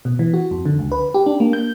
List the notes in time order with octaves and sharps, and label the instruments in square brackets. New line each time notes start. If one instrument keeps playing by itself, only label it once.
[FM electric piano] B2
E3
F#4
F2
D3
C#2
B4
G4
D4
A#3
G6